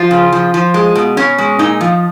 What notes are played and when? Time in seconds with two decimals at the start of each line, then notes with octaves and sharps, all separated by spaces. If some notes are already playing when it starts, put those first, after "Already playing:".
Already playing: F3 F4
0.11 C#3
0.32 F3
0.54 F3
0.74 G#3
0.95 B2
1.17 B2 C#4
1.38 G#3
1.59 A#2 D#4
1.81 F3